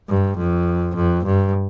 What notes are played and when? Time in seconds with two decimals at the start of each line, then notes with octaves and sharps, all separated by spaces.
0.09 G2
0.38 F2
0.96 F2
1.25 G2